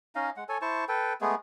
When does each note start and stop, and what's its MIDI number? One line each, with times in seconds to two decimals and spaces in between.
0.15 0.30 61
0.15 0.30 63
0.15 0.30 75
0.15 0.30 77
0.37 0.44 56
0.37 0.44 78
0.49 0.58 69
0.49 0.58 73
0.49 0.58 80
0.62 0.85 64
0.62 0.85 72
0.62 0.85 81
0.62 0.85 85
0.88 1.13 69
0.88 1.13 71
0.88 1.13 79
1.21 1.35 56
1.21 1.35 57
1.21 1.35 59
1.21 1.35 68